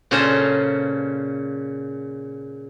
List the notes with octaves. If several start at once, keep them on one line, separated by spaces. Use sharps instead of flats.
A#2 C#3 C#4 A4 C5 A#5